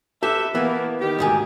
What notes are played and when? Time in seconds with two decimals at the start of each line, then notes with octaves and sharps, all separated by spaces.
0.23 G4 A4 B4 E5
0.55 E3 A#3 B3
1.00 D#3 G4
1.19 D2 G#2 G#4